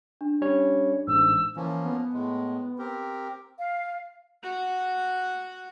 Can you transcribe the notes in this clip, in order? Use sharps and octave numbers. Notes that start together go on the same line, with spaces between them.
D4
G3 C#4 C#5
A1 G#2 E6
E3 F3 A#3 C#4
B3
A2 G#3
C4 G4 A#4
F5
F#4 F#5